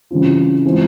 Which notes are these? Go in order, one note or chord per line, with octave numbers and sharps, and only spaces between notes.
C#3 E3 G3 C4 F4
E3 G#3 C4 F4